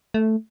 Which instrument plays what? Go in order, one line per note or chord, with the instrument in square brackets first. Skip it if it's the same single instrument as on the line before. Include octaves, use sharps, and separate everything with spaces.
[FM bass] A3